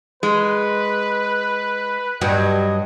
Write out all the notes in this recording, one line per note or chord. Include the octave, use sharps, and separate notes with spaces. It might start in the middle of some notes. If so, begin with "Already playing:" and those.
G#3 B4
G2 F#3 D#5